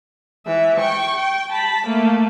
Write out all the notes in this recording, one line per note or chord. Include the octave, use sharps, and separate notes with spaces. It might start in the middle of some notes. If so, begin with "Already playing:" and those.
E3 E5
G5 C#6
G5
A5 B5
A3 A#3